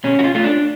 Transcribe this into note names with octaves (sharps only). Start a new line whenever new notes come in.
B2 C#4
F#4
F4
A3 F4
D4